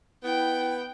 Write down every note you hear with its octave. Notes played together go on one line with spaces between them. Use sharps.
B3 E4 G5